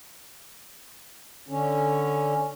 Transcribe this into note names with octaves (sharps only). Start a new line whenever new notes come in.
D3 C#4